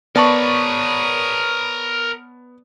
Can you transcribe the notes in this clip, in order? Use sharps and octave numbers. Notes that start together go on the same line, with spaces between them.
B3 A#4 C#5 D5 A5 B5 C#6 D#6